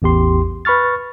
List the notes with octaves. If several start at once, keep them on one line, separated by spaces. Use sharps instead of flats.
A1 E2 G4 C6
B4 B5 C#6 F6 A6